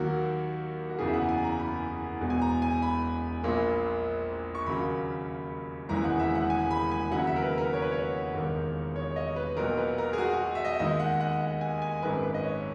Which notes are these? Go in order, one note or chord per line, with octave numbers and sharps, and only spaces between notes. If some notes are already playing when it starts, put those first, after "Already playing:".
Already playing: D#2 D#3 F#3 A#3 F#4
F#4
F#1 E2 C#3 E3 G#4
E5
F#5
G#5
A#5
B5
E1 E2 B2
G#5
A#5
G#5
B5
A#1 A#2 A#3
C#6
D#2 C#3 F#3 A#3 B5
E1 D#2 C#3 E3 G#3 A#5
F#5
E5
F#5
G#5
B5
G#5
D#2 C#3 F#3 F#5
E5
A#4
B4
A#4
C#5
B4
C#5
E1 D#2 D#3 A#3
C#5
C#5
D#5
B4
B1 A#2 F#3 A#3 A#4
B4
A#4
G#4
F#4
F#4
E5
D#5
E5
D#2 D#3 G#3 D#5
F#5
F#5
F#5
G#5
G#5
G#1 F#2 D#3 G#3 B4
B4
D#5
C#5